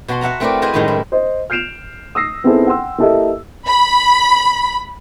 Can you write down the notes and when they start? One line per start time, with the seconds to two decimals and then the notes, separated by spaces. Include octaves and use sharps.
0.08 B2 F#4 A5 B5 C6
0.21 F#4 E5 F#5 A5 A#5
0.40 A3 C4 E4 A#4 B4 D5
0.62 E4 G#4 B4 C5 D#5
0.74 F#2 A2 D#3 G3 G#3
0.88 E4
1.12 C5 D#5
1.50 F6 G6 C7 D7 E7 F7
2.15 D#6 E6 A#6 C7
2.44 B3 C4 D#4 E4 G#4 A4
2.67 F#5 G5 C6 E6
2.98 A#3 E4 G4 A4 D#5 E5
3.66 B5